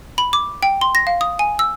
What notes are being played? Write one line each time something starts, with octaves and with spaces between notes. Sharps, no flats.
B5
D6
G5
C6
A#6
F5
D#6
G#5
E6